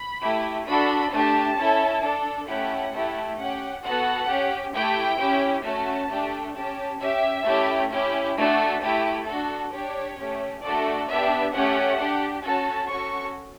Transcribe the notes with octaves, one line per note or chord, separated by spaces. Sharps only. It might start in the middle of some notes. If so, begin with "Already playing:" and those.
Already playing: B5
A3 E4 G4
D4 F#4 A4 B5
A3 D4 G4 A5
C#4 E4 A4
D4 A4
A3 C#4 E4 G4 F#5
A3 E4 G4
C#4 G4 F#5
B3 F#4 A4 F#5
C#4 G4
A3 E4 G4 G5
C#4 E4 G4
A3 C#4 F#4 A5
A3 D4 G4
C#4 G4 A5
C#4 G4 E5
A3 C#4 E4 G4
C#4 E4 G4
A3 D4 F#4 A4
A3 E4 G4
D4 F#4 A4
D4 G4 C#5
A3 C#4 G4
A3 D4 F#4 A4 D5
B3 D4 G4 E5
A3 C#4 G4 F#5
D4 G4
C#4 F#4 A4 A5
C#4 F#4 A4 C#6